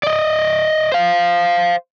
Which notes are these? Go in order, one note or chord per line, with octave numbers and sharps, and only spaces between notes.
D5 D#5
C5 F5